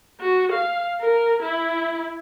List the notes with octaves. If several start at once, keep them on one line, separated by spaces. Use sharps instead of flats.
F#4
F5
A#4
E4